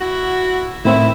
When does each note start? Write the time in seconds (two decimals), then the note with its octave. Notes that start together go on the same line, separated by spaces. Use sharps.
0.01 E4 F#4
0.85 A2 D#3 C4 E4 E5